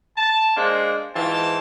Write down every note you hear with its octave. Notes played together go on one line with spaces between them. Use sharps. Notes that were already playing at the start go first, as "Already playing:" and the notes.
A5
G#3 A#3 D4 C5
G#2 E3 F4 E5 G5 A5